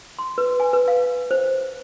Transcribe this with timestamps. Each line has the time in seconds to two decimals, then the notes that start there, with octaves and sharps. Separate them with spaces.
0.19 C6
0.38 B4
0.60 G#5
0.73 B4
0.88 F5
1.31 C5